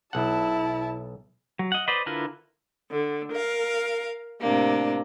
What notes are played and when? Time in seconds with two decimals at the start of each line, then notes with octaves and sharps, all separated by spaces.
0.13 B1 E4 F#5 A5
1.59 F#3
1.72 D#5 F#5
1.88 B4 C5 D5 D#5
2.06 D3 E4 F4 A#4 B4
2.91 D3
3.32 A#4 F5
4.42 A2 C3 A#3 D4